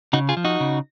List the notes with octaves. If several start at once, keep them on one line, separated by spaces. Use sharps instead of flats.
C#3 D#4 F#4
F4 G#4
F3
D#4 F#4
C#3